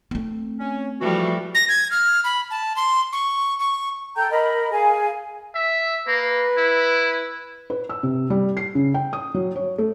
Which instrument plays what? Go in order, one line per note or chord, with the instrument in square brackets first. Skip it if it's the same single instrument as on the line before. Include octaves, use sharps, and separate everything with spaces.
[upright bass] A3 C4
[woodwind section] C#4
[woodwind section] E3 F#4 [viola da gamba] F3 G3 A3
[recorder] A#6
G#6
F6
B5
A5
C6
C#6
C#6
[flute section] A4 G5 A#5 G6
A#4 D#5 A#5 B5
G#4 F5 G#5
[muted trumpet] E5
[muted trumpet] A#3 [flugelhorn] B4
[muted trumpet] E4
[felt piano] B4
E6
C3
G3
C7
C#3
G5
D#6
F#3
C#5
A3